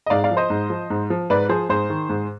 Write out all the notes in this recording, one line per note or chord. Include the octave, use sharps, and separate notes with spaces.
D#5
G#2 D5 F5
D5 F5
F3
C5 D#5
G#2
F3
G#2
F3
G#2 B4 D5
F3 G#4 C5
G#2 G#4 C5
D#3
G#2